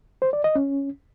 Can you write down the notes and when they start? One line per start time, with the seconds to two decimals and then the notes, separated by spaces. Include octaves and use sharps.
0.22 C5
0.33 D5
0.44 D#5
0.55 C#4